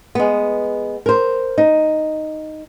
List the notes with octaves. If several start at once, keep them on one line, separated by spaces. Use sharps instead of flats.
G#3 B3
A#4 C5
D#4